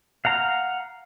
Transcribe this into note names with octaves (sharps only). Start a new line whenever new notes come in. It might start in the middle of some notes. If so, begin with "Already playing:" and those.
F5 F#5 A#5